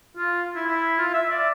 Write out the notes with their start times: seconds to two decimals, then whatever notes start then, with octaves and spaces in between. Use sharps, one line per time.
0.17 F4
0.56 E4
0.67 E4
0.98 F4
1.14 E5
1.30 D5